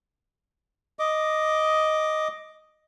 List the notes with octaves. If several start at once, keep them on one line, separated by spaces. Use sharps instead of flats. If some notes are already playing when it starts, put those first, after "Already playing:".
D#5 D6